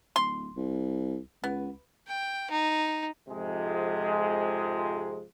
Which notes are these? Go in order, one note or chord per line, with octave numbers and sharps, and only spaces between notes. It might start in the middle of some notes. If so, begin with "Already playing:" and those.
D1 C6
C2
C#2 B3
G5
D#4
F2 G#2 C3 F3 G#3